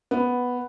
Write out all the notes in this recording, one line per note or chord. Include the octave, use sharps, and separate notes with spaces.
B3